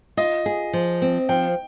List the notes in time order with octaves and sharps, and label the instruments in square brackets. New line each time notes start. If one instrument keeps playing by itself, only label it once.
[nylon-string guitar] F4 [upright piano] D#5
[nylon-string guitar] G#4
F3
C4
[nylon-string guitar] F3 [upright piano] G5